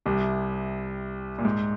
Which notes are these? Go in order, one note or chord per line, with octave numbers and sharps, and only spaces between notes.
C2 C3
A#2
G#2